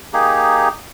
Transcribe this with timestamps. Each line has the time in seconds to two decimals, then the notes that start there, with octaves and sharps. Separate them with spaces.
0.13 A#3 D#4 G4 G#4